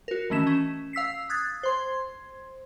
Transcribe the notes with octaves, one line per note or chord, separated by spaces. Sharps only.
F#4 A#4
D#3 E3 A3 C#4 B6 E7
C#4
F5 E6 B6 C7
D#6 F#6 G#6 A6
C5 C6 G#6